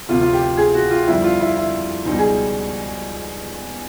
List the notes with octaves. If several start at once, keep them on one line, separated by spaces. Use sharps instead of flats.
D2 C3 F3 F4
F4
G4
G#4
F#4
F4
F2 D3 G3 E4
F4
E4
E4
C#2 B2 G3 D#4
G#4